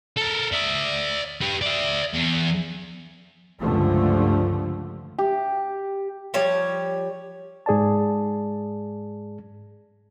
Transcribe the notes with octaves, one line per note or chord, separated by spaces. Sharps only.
A4 A#4
D5 E5
G4 B4
D5 E5
E2
C#2 G2 D3 F3 A3
G4
F3 G3 C#5
G#2 G#4 D5 A5